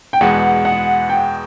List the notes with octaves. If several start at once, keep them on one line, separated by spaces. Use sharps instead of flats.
G5
E2 B2 G#3 B3 F#5
F#5
G5